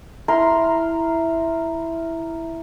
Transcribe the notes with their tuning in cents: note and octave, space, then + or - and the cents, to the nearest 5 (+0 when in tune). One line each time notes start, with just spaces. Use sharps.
E4 +0 A#4 -5 C6 -10